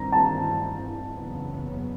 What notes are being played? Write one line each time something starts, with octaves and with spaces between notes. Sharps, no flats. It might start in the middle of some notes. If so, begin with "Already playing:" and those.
Already playing: G2 D#3 G3 C4 A#5
A5
F#1 E2 C#3 F#3 B3